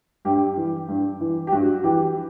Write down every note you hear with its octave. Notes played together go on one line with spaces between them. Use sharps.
G2 G4
E3
G2
E3
G4
G2 F#4
E3 G4